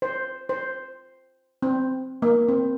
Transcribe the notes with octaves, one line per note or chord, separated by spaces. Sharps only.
C5
C5
C4
A#3
C4